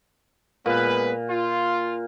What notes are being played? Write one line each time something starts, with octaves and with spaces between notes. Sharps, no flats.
A#2 G#3 B3 B4
F4